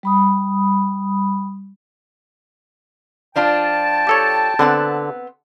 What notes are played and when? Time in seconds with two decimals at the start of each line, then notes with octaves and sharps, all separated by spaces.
0.03 G3 B5 D#6
3.36 F3 D4 F4 G5 A5
4.07 G4 A4 C#5
4.59 D3 B3 C4 F#5